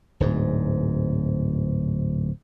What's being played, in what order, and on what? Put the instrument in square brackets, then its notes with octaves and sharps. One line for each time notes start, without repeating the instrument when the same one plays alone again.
[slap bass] D1 G#2